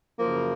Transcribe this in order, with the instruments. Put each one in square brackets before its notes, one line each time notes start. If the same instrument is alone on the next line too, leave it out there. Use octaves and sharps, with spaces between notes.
[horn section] F#2 C#3 F3 A#3